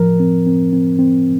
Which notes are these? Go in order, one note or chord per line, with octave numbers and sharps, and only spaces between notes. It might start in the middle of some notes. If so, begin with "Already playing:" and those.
Already playing: A2 F3 A#4
C4
C4
C4
C4